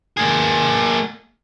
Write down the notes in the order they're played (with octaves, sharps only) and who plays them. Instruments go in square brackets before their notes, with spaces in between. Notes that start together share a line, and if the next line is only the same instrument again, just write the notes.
[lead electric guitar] A#3 G#4